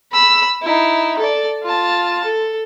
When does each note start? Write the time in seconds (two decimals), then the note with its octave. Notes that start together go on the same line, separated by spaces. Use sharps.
0.12 B5 E6
0.62 D#4 E4
1.19 A4 D5
1.63 F4 A5
2.25 A4